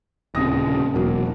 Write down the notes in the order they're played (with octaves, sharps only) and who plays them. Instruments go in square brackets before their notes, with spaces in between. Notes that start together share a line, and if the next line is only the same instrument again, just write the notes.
[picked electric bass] D#1 C#3 [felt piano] C2 D#6 A#6
[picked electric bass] E1 [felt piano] B2 F#3 A#3